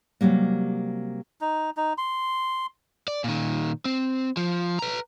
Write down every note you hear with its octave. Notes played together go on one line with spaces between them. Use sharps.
C3 F#3 G3 A#3
D#4
D#4
C6
D5
A#2 D#3
C4
F3
B4 A#5